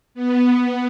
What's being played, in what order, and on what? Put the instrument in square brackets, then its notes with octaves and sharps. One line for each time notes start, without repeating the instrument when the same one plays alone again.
[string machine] B3